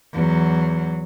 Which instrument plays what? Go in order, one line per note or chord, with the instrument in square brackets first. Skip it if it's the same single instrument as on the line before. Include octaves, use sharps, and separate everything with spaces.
[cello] E2 F#3